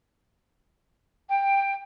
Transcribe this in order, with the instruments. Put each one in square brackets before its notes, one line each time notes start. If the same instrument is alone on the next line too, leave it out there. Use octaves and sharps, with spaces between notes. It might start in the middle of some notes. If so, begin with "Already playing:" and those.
[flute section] G5